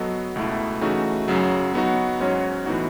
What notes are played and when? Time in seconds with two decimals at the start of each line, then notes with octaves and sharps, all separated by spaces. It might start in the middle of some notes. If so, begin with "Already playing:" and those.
Already playing: F#3 B3 F#4 A4 D#5
0.36 C#2 B2 A3 E4
0.81 C#3 E3 A3 D#4 F#4
1.28 F#2 C#3 F#3
1.74 F#3 B3 D#4 F#4
2.20 G#2 F#3 C#4 F#4 C#5
2.66 A2 E3 B3 D#4 F#4